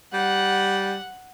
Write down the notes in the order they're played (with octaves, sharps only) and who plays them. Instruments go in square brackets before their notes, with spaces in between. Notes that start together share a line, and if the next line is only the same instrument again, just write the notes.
[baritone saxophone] G3 [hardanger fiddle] F#5